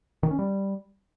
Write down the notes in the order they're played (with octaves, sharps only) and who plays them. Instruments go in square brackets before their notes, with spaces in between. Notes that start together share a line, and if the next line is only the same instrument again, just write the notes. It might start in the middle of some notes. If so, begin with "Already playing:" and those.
[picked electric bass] D#3
C#4
G3